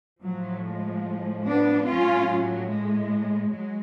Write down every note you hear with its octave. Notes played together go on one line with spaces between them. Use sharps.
A2 F3 F#3
G#3
B3 D4
A2 F#3 C#4 F4
F#3
G#3
F#3 G#3